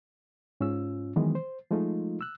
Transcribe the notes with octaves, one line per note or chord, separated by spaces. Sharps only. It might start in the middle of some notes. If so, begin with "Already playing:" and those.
G#2 C#4 F4 E6
D#3 E3 F#3 G#3 B3
C5
F3 G#3 A3 D#4 F4
E6 F#6